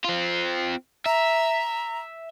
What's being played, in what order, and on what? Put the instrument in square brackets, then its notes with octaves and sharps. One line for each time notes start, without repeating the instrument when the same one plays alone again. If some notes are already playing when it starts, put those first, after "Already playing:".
[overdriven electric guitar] C4 F4
[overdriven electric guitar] E5 [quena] A#5